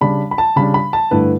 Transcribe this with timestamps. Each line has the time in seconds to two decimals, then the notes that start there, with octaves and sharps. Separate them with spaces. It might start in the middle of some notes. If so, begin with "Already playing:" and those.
0.01 C#3 G3 D4 B5
0.31 B5
0.38 A5
0.56 C#3 G3 D4 B5
0.74 B5
0.93 A5
1.11 G2 D3 A3 E4 B4